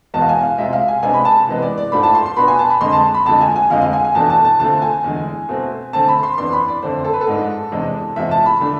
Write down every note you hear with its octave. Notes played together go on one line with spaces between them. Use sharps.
E2 B2 G#3 B3 A5
F5
G#5
F5
C3 F3 G#3 E5
F5
G#5
C3 G#3 B3 D4 G#5
B5
A5
C3 E3 G#3 B3
D5
D5
G#2 F3 A3 D4 B5
A5
C6
C6
B2 B3 D4 B5
G#5
A5
B5
F2 D3 G#3 C6
A5
B5
F2 D3 F3 G#3 A5
G#5
G#5
F2 D3 F3 G#3 F5
F5
G#5
G#5
E2 B2 A3 D4 A5
A5
A5
D3 F3 A3 C4 A5
G#5
E2 D3 G#3
B2 A3 C4
D3 A3 C4 A5
B5
C6
F2 E3 B3 D4 C6
B5
D5
F2 D3 A3 C5
A4
B4
A4
G#2 F3 G#3 D4
E2 C3 G#3 D4
E2 C3 F3 G#3 E5
A5
B5
D3 A3 D4